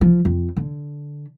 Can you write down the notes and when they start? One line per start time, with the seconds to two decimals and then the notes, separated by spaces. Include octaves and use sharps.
0.01 F3
0.25 F2
0.57 D3